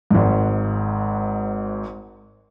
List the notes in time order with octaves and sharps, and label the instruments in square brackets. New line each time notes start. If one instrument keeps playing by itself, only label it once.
[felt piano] G#1 G#2